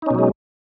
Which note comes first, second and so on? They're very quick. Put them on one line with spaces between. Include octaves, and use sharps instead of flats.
D#4 C#4 B2 F#3 G#3